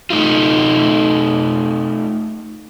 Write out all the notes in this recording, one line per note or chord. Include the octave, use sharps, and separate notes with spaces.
A3 D#4 F4